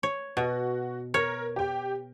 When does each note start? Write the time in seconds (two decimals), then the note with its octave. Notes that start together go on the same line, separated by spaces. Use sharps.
0.03 C#5
0.37 B2 F#4
1.14 A#4 C#5
1.56 G4 G5